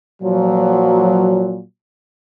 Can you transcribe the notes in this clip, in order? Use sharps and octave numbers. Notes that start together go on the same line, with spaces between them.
A#2 F3 F#3